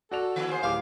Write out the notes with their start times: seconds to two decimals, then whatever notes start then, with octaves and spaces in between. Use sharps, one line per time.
0.11 F#4 A4 D5 F7
0.36 D#3 B3 E4
0.49 D#2 G#4 C5
0.63 D1 G4 F5 D6